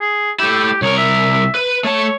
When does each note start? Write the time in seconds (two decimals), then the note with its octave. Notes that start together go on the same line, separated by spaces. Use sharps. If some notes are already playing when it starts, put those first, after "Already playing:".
0.01 G#4
0.39 A3 E4 G4
0.82 C2 A#4 C#5
0.98 E5
1.55 B4
1.84 A3 C#5 A5